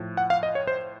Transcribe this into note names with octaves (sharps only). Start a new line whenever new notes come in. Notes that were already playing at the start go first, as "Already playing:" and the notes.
Already playing: A2 F3
F#5
F5
D#5
C#5
C5